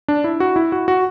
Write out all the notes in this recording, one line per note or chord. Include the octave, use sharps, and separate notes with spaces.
D4
E4
F#4
E4
F#4
F#4